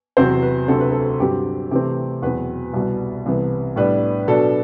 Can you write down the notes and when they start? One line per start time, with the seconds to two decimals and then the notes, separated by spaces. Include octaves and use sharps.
0.17 E2 C3 F#3 C4 C5
0.43 B4
0.68 D2 C3 F#3 C4 A4
0.80 B4
0.92 A4
1.20 G2 D3 F#3 C4 G4
1.71 C3 E3 A3 C4 G4
2.22 E2 B2 F#3 C4 B4
2.73 C2 B2 G3
3.26 C2 C3 E3 B3
3.76 A2 G3 B3 D4 B4
4.27 B2 F#3 B3 D4 A4